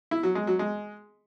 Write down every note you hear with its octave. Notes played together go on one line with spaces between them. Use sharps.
E4
F#3
G#3
F#3
G#3